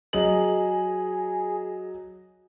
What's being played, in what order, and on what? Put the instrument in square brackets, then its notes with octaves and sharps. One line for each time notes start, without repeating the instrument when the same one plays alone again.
[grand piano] F#3 D#5 F#7 [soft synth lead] G#4